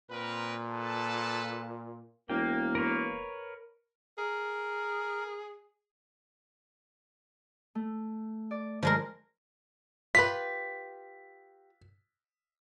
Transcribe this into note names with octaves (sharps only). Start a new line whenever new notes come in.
A#2 C4 A#4 B4
A4 B4 A5
E1 A#3 G5
A#4 B4 C#5
G#4 A#4
A3
D5
F3 G#3 A#4 D5
F4 G4 B4 B6